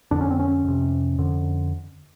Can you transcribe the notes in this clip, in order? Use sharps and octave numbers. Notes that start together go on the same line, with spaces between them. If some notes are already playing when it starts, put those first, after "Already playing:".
F2 D3 D4
C#4
C4
C#4
F2 C3
F2 D3